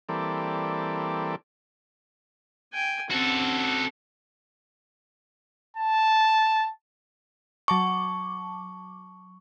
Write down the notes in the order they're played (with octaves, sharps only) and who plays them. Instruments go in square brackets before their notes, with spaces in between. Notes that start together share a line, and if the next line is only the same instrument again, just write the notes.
[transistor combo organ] E3 G3 A#3 C4 A4 D5
[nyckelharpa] G5 G#5
[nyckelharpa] C4 C#4 [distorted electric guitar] F#4 A4
[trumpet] A5
[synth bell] F#3 A5 D6 [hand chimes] C#6